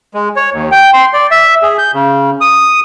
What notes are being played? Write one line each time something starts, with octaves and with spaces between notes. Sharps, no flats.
G#3
C#5
D#2
G5
C6
D5
E5
G#4
G6
C#3
D#6